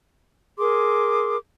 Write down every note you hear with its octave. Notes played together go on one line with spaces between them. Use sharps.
G#4 A#4 C6 D6